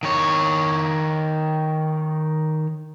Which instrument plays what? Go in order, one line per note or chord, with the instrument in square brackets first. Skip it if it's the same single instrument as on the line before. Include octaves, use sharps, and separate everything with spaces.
[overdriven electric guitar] D#3 C#5